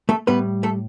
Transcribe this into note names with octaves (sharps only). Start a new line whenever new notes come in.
A3 A4
A2 G3 B3 B4
A3 A4